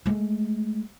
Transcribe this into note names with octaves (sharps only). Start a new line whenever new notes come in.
G#3 A3